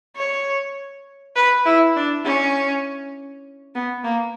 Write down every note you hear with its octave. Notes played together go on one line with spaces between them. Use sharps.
C#5
B4
E4
D4
C#4
B3
A#3